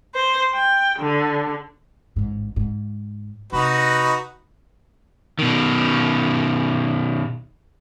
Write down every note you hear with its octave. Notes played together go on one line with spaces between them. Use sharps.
C5
G5
D3
A1 G#2
G#2
C3 D#4 F#4 B4
B2 D#3